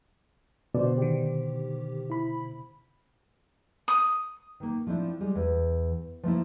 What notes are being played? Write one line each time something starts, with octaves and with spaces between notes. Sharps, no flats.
B2 D3 C5 D5
D#3 G4
E4 B5
D#6
D#3 A#3
F3 A3 C4 D4 E4
G3 G#3
E2
F3 A3 A#3 E4